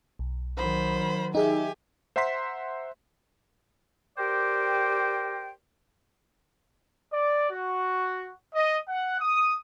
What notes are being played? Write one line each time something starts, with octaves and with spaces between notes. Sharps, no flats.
B1
D#3 F#3 C5 B5
D#4 G4 G#4 E5 G#5
C5 E5 F#5 A#5 C6 B6
G4 A#4 C5 D5 G5
D5
F#4
D#5
F#5
D#6